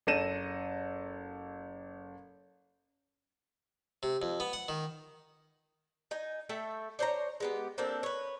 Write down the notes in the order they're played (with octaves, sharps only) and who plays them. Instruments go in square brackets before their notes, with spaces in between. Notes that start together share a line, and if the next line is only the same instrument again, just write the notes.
[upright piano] F#1 A4 A#6 D#7 E7
[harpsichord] C3
F2
B3
F#5
D#3
[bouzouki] D#4 G#5
A3 A4 E5 G5
D4 C5 C#5 A#5
G#3 B3 G4
A#3 C4 D4 A4
B4 C#5